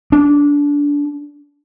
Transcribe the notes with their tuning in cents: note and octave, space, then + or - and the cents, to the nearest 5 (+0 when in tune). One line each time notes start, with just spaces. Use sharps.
D4 -20